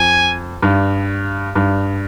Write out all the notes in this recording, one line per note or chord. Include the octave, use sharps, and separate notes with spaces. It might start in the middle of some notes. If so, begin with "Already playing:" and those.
Already playing: F2 G#5
G2
G2